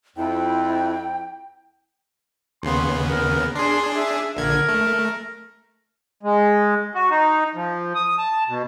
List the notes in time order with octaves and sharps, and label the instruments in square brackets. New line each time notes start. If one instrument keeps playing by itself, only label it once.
[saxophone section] F2 [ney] E4 [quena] G5
[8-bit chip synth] D#2 C#3 B3 [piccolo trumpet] C6
[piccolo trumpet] A#4
[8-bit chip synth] D4 G#4 [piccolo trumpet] C6
[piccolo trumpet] E5
[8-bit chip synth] A#1 D3 G#6 [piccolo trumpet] A#4
[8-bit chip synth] A3
[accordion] G#3
F#4
D#4
F3
D#6
A5
B2